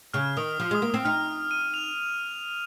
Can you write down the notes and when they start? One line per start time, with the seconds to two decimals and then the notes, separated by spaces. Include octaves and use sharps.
0.14 C#3 F6
0.37 D#3 D#6
0.60 F3
0.71 G#3 D#6
0.82 A#3
0.90 C4 D#6
1.05 D#4 F6
1.51 D#7
1.74 F7